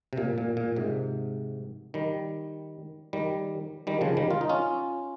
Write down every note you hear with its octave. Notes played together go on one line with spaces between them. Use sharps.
C3
A#2
A#2
A#2
G#2 C3
D#3 G3
D#3 G3
D#3 G3
C#3 F3
D#3 G3
F4
D#4
C#4 F4